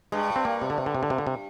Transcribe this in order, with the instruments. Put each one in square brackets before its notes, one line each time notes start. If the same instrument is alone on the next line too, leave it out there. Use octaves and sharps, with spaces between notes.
[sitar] G2 [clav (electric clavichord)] G#3
[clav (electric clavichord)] C4
A#3
C3
D3
C3
D3
C3
D3
C3
D3
C3